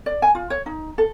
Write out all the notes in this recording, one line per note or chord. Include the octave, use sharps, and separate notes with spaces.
D5
G#5
F4
C#5
D#4
A4